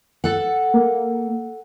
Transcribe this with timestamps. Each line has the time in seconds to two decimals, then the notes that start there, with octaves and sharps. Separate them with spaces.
0.24 A4 F#5
0.74 A#3